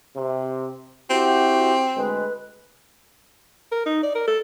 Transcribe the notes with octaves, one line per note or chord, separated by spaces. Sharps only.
C3
C4 E4 F#4 G4
D2 G#3 B4
A#4
D#4
D5
A#4
A4